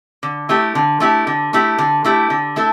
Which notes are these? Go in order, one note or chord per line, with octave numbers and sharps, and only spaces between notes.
D3
A3 E4 G4
D3
A3 E4 G4
D3
A3 E4 G4
D3
A3 E4 G4
D3
A3 E4 A4